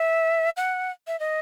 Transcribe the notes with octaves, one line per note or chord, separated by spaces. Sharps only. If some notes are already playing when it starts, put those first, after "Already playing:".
Already playing: E5
F#5
E5
D#5